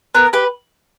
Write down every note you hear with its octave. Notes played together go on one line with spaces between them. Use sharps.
B3 A#4
G4 B4